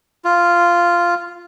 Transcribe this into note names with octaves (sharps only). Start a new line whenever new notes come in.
F4